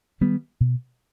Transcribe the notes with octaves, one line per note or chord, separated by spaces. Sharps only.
D#3 G3 B3
B2